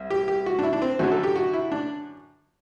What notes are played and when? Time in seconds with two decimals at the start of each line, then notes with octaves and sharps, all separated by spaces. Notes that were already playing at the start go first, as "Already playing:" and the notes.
Already playing: C2
0.10 G4
0.28 G4
0.46 F#4
0.59 D4
0.63 E4
0.73 D4
0.82 C4
0.99 F#2 D3 F#3 F#4
1.12 A4
1.23 G4
1.36 F#4
1.53 E4
1.72 D4